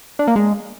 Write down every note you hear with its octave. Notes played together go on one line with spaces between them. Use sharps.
D4
A#3
G#3